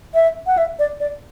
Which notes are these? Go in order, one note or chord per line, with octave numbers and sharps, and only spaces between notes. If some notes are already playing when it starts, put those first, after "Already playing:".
E5
F#5
E5
D5
D5